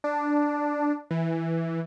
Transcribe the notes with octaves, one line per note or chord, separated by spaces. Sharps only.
D4
E3